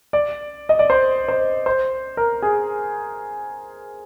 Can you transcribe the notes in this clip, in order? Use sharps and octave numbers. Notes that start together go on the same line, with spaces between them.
D5
D#5
D5
C5
C5
C5
A#4
G#4